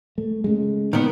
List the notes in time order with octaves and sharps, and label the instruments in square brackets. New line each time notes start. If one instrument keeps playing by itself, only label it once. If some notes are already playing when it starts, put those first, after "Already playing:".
[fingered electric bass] A3
C#3 G#3
[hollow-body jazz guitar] D#3 B3